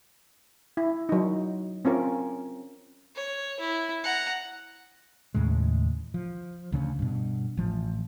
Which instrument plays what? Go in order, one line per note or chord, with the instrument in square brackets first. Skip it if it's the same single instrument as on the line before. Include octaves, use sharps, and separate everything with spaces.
[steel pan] E4
F#3 D#4
C4 C#4 F4 A#4
[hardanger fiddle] C#5
E4
F#5 A#5
[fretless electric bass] D#2 A2 C#3 G#3
F3
D2 C#3 B3 C#4
G2 B2
A1 F3